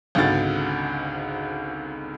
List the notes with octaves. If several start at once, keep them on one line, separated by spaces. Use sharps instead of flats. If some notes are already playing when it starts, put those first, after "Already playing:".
G#1 C#2 G#2 D3 F#4 A6